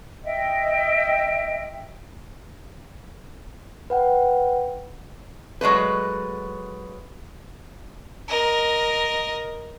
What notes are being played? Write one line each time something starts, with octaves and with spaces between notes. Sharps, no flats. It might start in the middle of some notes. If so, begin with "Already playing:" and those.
D#5 E5 G5
B4 F#5 G5
F#3 G#3 A3 B4
A#4 D#5